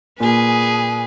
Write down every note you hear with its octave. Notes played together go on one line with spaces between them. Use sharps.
A#2 A#3 G#4 B4 G#5